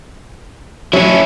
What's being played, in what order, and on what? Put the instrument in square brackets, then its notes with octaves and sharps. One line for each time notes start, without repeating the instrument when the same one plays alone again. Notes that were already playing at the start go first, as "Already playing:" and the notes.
[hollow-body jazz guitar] F#3 [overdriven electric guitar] C#4 E4